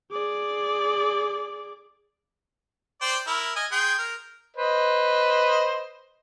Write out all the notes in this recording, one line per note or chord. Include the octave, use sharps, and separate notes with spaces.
G#4 D5
C5 D5 G5
E4 A#4
D#5 G#5
G#4 G5 C6
A#4
B4 C5 D#5